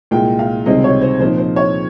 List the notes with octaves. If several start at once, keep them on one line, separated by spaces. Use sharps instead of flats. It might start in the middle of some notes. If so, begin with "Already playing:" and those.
C2 A#2 G#3 G5
F5
C#2 C3 D#3 G3 C4 D#5
C#5
C5
A#2 F3 C4 D#4 C5
C5
C#5